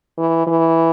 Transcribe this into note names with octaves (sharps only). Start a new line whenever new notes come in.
E3
E3